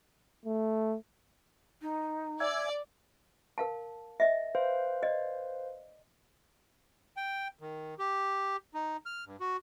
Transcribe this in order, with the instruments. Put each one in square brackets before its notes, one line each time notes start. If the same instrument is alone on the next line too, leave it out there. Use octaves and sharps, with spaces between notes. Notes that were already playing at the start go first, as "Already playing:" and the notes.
[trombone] A3
[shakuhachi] D#4
[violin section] D5 [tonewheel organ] E5 G#5
[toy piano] A#4 F5 A5
D#5 E5
[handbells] B4 C5 F5
[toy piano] D5 D#5
[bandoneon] G5
D#3
G4
D#4
F6
G2
F#4